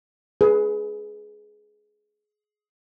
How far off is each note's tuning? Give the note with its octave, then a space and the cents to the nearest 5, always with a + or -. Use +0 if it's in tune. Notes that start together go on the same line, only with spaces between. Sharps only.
G#4 +20 B4 +0